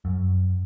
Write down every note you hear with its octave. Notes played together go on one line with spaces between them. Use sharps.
F#2